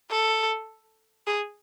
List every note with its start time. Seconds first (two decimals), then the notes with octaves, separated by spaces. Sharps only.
0.10 A4
1.27 G#4